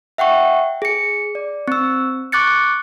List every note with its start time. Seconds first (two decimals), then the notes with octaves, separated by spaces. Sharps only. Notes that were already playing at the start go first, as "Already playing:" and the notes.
0.18 E5 F#5 G5 C#6
0.82 G#4 C#7
1.35 D5
1.68 C4 E6
2.32 C#6 D6 F#6 A6 C#7